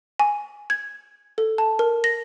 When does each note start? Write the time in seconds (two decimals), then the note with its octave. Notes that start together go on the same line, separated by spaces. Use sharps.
0.19 G#5
0.70 G#6
1.38 A4
1.58 A5
1.79 A#4
2.04 A#6